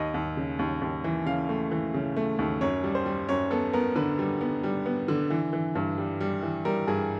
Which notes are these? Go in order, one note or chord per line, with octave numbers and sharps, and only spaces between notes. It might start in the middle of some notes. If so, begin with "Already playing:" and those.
Already playing: D#2 D#5
D#2
C#3
D#2
D#2
E3
C#3 F5
A3
E3
C#3
A3
D#2
F#2 C#5
G3
C5
G3
F#2 C#5
B3 A4
B3 A#4
D3 B4
G3
B3
G3
B3
D3
E3
E3
G2
G3
G3
E3
G3 A#4
G2 G#4